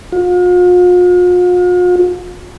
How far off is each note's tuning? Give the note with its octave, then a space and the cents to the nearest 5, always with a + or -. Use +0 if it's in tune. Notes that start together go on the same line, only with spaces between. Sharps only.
F4 +45